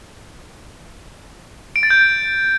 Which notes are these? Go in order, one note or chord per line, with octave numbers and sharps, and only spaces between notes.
D7
A6
G6